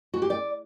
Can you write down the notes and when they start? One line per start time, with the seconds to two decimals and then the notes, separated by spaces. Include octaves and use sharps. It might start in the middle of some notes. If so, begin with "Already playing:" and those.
0.14 F#4
0.22 G4
0.30 D5